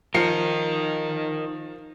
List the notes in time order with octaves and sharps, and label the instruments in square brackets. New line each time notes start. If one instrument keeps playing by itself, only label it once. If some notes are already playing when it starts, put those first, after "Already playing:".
[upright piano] F3 C7 C#7 [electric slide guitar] D#4 A#4